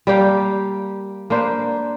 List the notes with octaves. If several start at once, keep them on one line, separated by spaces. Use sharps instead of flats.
G3 A#3 G4 F5
A#3 D4 B4 C5